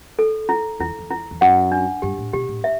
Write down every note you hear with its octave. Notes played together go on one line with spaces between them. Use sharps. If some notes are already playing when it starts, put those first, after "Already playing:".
A4
E4
E2 E4
E2
E4
E2
F#2 F#5
D4
G2 G4
A2
B2 G4
A2
E5